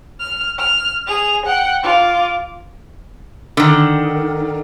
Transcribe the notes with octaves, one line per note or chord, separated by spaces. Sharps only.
F6
F6
G#4 F7
F#5 G5
F4 D6
D3 D#3